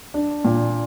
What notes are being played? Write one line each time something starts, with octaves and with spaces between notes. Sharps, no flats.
D4
A#2